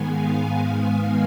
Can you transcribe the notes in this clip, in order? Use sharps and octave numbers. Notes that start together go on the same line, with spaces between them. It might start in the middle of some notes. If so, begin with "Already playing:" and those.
Already playing: G#2 D#3 G#3 B3 G#5
F5
F5